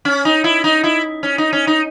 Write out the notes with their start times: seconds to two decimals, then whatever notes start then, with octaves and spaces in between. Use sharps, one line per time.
0.05 C#4
0.25 D#4
0.44 E4
0.64 D#4
0.84 E4
1.23 C#4
1.38 D#4
1.53 C#4
1.67 D#4